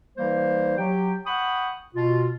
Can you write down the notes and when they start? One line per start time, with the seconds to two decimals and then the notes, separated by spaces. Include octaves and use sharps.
0.17 E3 G3 A#3 D#4 C5
0.77 F#3 G4 G5
1.25 F#5 G5 B5 C#6 D#6
1.95 B2 F4